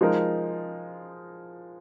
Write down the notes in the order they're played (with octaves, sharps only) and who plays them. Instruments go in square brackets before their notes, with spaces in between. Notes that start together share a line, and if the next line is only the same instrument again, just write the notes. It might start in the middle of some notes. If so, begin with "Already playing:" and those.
[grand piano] F3 G#3 D#4 A#4